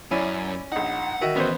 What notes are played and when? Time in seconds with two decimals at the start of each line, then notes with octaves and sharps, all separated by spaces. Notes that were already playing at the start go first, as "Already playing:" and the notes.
0.11 F#2 C#4 E4 D5
0.72 A#1 D#4 F#5
1.22 D#3 F#4 E5
1.36 E3 B3 C#4 C5